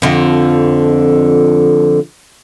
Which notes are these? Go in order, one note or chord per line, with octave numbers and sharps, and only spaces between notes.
F2 D3